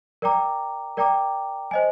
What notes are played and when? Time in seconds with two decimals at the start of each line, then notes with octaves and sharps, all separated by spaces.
0.22 A#4 D5 G5 A#5 D6
0.97 A#4 D5 G5 A#5 D6
1.71 C5 D#5 G#5